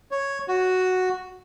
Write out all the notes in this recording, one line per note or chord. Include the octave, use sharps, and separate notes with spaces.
C#5
F#4